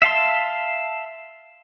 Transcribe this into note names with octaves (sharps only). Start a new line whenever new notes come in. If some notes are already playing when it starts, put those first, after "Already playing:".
E5 F5 A5 C6